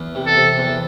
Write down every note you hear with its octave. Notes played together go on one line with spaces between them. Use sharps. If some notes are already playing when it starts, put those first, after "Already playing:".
Already playing: E2
C3
A4
C3
E2